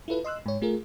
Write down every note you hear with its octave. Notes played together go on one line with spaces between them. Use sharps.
E4 F4 A4 B4
D#5 C6 E6 F#6
G#2 C#5
A3 F4 G#4 A#4